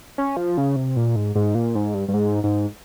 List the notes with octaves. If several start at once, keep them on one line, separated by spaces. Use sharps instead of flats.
C#4
F3
C#3
C3
A#2
G#2
G#2
A#2
G#2
G2
G2
G#2
G#2